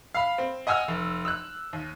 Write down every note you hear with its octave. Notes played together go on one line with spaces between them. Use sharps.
F5 B5
C4
D#5 F#5 G#5 E6 F6
F1
E6 F#6
D#2